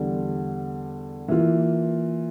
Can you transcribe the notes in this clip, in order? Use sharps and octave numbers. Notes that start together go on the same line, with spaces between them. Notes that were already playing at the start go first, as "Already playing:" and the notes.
Already playing: E2 D3 G3
E3 A#3 F4